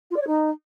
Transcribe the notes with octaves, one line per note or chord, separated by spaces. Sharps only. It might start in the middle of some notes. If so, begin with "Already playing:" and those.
F4
D5
C#5
D#4